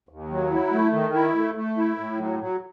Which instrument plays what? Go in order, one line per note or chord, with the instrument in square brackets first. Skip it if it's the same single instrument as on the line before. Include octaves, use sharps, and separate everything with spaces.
[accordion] D#2
F#3
E4
A3
D#3
E4
A3
A3
E4
A2
F#3
F#3